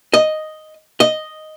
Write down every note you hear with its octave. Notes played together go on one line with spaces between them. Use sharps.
D#5
D#5